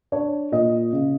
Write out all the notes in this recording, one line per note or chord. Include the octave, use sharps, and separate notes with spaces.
D4 C#5
A#2 D#5
C#3